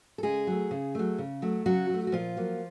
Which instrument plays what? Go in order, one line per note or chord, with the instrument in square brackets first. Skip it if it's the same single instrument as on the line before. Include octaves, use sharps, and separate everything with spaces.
[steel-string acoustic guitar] A4
C#3 G#3 G#4
F#3 A3
C#3
F#3 A3
C#3
F#3 A3
C#3 F#3 F#4
F#3 A3
F#4
A#2 F3 F4
F#3 A#3